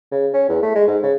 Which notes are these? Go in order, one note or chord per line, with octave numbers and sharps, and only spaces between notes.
C#3
C#4
E2
A3
G#3
G#2
C#3